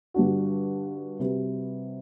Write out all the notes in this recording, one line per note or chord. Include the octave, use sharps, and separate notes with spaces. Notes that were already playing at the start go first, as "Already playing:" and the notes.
G2 D3 G3 D4 F#4
C3 G3 C4 F#4 B4